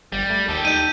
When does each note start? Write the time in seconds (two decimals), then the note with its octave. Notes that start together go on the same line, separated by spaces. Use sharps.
0.12 G1 G3
0.30 A3
0.48 D#2 G4 A4
0.65 D#4 G6 D#7